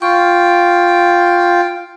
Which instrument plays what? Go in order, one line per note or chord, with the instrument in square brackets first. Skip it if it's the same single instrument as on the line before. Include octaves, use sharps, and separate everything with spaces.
[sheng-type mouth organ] F4 G5 [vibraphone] C#6